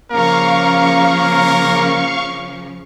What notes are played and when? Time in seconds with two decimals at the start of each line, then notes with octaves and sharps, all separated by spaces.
0.12 C#3 F3 A#3 C#4 A#4 F5 C#6